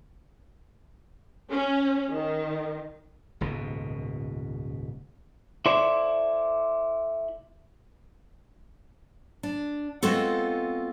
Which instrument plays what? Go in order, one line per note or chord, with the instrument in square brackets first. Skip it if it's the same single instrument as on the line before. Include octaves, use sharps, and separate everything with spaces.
[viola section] C#4
D#3
[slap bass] D#1 C#2 G#2 B2
[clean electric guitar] E4 A4 C5 D5
[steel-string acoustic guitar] D4
G#3 B3 C4 F4 F#4 A4